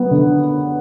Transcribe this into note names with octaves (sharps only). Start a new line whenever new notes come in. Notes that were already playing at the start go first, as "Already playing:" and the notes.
Already playing: F#3 B3
D3